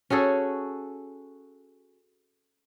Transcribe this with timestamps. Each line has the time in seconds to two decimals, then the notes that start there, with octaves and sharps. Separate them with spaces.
0.10 C#4 F#4 G#4 A4